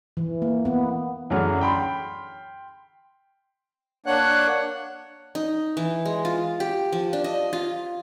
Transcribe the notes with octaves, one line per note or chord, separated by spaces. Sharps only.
E3
A#3
B3
F#2 D3 E3 F#3 G#4 F6
G5 B5 C6
A#3 D4 C#5 F#5 F#6
D#4
E3
G#3
F4
G4
F3
D4
D#5
F4